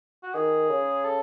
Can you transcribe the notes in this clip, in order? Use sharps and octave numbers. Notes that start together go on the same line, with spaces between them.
F#4
D#3 G#4
C#3
A4